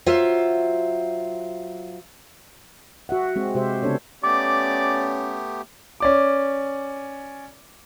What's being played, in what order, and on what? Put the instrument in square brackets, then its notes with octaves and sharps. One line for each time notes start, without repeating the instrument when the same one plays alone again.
[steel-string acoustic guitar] F#3 F4 C5 E5
[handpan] F#4 E5 F#5
G#3 C4 G#4
C3 G#3 G4 C5 E5
C#3 B3 C4 D4 A4 C#5
[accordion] A3 B3 G4 [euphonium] C#4 [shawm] D5 [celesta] D6
[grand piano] C#4 D5 D6